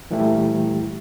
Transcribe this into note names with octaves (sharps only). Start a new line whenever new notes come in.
A#2 E3 G3 A3 E4 G4